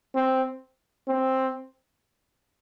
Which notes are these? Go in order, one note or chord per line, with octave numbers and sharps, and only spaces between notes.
C4
C4